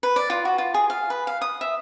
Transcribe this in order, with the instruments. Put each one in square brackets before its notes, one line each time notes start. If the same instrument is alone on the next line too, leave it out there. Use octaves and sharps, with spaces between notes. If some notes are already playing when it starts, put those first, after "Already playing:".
[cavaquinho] B4
D5
F4
F#4
F4
G#4
F5
B4
F5
D#6
E5